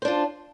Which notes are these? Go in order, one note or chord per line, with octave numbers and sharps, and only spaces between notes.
D4 F4 C5